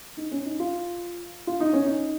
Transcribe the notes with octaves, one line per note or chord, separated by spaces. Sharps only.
D#4
C#4
D#4
F4
F4
D#4
C#4
D#4